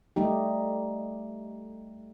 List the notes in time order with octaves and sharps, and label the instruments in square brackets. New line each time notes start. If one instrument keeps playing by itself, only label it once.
[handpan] G3 A3 D#4 G4